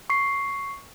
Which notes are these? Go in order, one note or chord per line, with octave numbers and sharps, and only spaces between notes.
C#6 C7